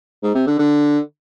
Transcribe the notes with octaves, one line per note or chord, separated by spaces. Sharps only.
G#2
C3
D3
D3